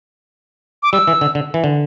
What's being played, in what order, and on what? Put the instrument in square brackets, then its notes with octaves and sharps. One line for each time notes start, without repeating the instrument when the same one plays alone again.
[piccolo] D6
[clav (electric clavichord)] G3 [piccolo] E6
[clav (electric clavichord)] E3
D3
D3
E3
D3